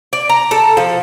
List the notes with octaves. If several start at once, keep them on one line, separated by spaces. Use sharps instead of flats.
D5
A#5
A4
F3